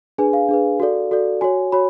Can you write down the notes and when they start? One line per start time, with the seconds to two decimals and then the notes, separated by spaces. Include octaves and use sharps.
0.18 D4 G#4 B4 G#5
0.33 F5
0.49 D4 G#4 B4
0.80 F#4 A4 D5
1.11 F#4 A4 D5
1.41 F#4 C#5 G#5
1.72 F#4 C#5 B5